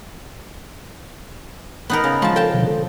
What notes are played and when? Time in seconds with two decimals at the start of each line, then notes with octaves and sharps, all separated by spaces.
1.90 B3 D#4 A#4
2.04 C#3
2.22 F3 G#3 A5
2.36 A4 G5 A5
2.54 B2 D3 F3
2.67 A4